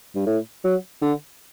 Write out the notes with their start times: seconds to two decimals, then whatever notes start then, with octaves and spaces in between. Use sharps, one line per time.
0.15 G2
0.27 A2
0.64 F#3
1.02 D3